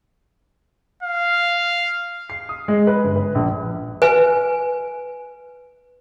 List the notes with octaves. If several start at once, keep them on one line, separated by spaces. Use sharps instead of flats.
F5
C7
D#6
G#3
B4
G1
B4
A#1
B4 G#5